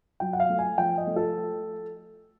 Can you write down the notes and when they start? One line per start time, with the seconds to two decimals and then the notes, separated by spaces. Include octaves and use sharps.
0.20 F#3 G5
0.33 F#5
0.40 F5
0.50 A3
0.59 G#5
0.78 F3 G5
0.98 D#5
1.07 A3
1.16 A4